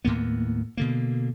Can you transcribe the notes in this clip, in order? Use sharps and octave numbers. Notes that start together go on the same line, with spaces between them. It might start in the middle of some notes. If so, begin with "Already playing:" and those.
D#2 A2 A#3 B3
B2 D3 A#3